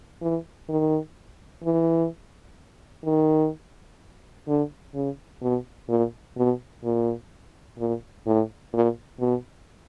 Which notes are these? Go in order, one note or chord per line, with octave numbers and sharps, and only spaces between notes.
E3
D#3
E3
D#3
D3
C#3
B2
A#2
B2
A#2
A#2
A2
A#2
B2